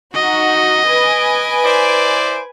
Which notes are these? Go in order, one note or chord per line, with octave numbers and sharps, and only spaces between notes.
D#4 F#4 D#5
B4 G#5 D7
E4 C5 D5